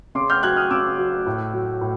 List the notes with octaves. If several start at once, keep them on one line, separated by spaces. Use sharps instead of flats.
C#3 C6 D6
F6 G6
F#3 F#6 G#6
D#6 F6
C#3 D6 E6
F#3
A2
F#3
A2